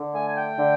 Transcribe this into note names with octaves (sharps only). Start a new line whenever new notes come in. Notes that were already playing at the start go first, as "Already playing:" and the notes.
Already playing: D3
A3 G#5
G#5
G5
D3